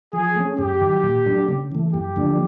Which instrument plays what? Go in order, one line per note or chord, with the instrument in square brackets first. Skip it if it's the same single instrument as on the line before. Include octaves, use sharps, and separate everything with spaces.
[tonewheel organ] F3 [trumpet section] G#4
[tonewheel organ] A3 C#4
[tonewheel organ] F#2 [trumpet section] G4
[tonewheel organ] D#3 F#3
A#2
F#3 A3 D4
C#3
E3 A3
[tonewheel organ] F#2 [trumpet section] G4
[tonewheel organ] D3 F3 A3 D4